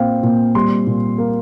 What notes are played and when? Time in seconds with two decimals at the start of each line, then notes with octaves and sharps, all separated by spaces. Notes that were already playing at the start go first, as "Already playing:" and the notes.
Already playing: A#2 C4 F5 G5
0.23 A#2
0.55 G3 C6
0.87 A#2
1.18 A#3